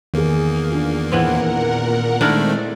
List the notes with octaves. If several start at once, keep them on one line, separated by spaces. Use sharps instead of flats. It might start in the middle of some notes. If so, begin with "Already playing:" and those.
E2 D#3 A#3 G#4
D4 F4
A#2 E3 B3 C4 A#4 F#5
D#3 G#3 A3 C4 D4 E4 A#4